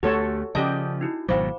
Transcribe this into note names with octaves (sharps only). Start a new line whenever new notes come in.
D2 A3 F#4 G4 A4 C#5
C#3 F3 C#4 G4 D5 D#5 A5
D#4 E4 F#4
G#1 B2 F#3 C5 F5 G5 B5 D6